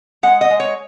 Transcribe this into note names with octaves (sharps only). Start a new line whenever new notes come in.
G#3 F#5
D#5
G#3
C#5